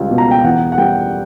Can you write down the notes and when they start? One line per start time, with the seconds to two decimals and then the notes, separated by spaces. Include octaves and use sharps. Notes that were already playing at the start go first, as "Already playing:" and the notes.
Already playing: C#2 G3
0.11 B2
0.18 A#5
0.31 G5
0.44 E2 F#5
0.72 F#5
0.78 G3 G5